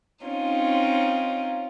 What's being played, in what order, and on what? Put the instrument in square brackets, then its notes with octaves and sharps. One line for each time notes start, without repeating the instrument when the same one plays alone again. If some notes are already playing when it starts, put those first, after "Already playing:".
[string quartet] C4 C#4 D#4 F4